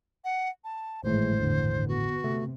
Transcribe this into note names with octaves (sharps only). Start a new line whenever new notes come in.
F#5
A5
G#1 A2 E3 G#3 A3 C5
E2 G2 D3
B3 F#4
C3 A3